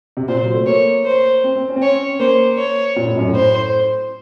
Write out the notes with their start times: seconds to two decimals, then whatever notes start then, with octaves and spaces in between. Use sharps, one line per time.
0.17 C3
0.28 A#2 C5
0.42 F#3
0.54 A3
0.67 A#3 C#5
1.05 C5
1.44 C4
1.56 C4
1.69 C#4
1.76 C4
1.81 C#4 C#5
2.20 A#3 C5
2.58 C#5
2.96 A#2
3.07 A2
3.17 F#2
3.28 A2
3.35 C5